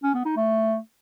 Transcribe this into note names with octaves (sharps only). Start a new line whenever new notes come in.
C#4
B3
D#4
A3